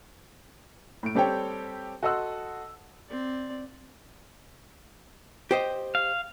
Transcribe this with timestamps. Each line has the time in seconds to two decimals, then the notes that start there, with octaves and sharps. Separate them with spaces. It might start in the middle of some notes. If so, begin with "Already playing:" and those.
1.03 A2 D7
1.15 G3 C4 G4 A4 C#5 G5
2.03 F#4 A4 D#5 C6 E6 F#6
3.09 C4 D5
5.51 G4 C5 D#5
5.95 F5